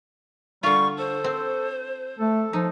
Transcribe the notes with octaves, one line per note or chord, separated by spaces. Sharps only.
D3 G3 F4 C#6
A4 C5
C4
A3 A4
F3 D#4